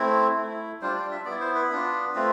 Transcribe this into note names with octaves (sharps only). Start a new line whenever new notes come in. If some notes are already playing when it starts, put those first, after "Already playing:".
Already playing: A3 C4 E4
A3 E4
G3 D4 F4 C5
D5
E5
B3 D5
E4
C5
B4
B3 D4 F4
A3 C4 F4